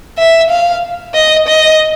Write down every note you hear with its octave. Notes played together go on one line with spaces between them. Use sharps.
E5
F5
D#5
D#5